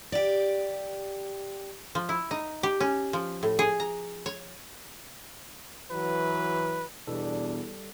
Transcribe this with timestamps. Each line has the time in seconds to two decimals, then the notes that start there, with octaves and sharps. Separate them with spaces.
0.12 G4 D5
1.95 F3
2.09 E4
2.31 D#4
2.63 G4
2.80 C#4
3.13 F3
3.43 A2
3.59 G#4
3.80 A#5
4.26 C#5
5.91 E3 F#3 B4
7.08 E2 B2 G3 D4 A4